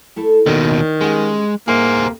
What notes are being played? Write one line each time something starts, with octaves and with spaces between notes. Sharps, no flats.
A3 E4 A4
D#2 B2 D#3 D5
G3 G#3 C#4 F#5
A#3 G#4 C5 E5
D2 C3